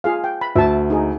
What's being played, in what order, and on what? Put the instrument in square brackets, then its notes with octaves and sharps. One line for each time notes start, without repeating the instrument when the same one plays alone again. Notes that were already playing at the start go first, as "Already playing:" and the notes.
[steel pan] F4 G#4 F5
G5
B5
[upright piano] D2 [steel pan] E5 A5
[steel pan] D#4 G#4